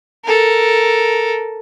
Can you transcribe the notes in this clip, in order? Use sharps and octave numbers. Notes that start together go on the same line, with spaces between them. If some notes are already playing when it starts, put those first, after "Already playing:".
A4 A#4